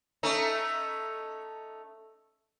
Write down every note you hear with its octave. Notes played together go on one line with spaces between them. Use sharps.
A3 C#4 D#4